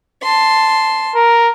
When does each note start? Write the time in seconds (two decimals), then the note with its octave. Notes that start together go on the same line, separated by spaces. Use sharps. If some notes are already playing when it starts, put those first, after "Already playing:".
0.22 A5 C6
1.15 A#4